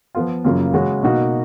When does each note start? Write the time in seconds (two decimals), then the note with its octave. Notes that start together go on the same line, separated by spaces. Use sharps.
0.15 F3 B3 F4
0.44 F#2 C#3 F#3 A#3 F4
0.74 C#3 G#3 C#4 F#4
1.03 B2 A#3 D#4 F#4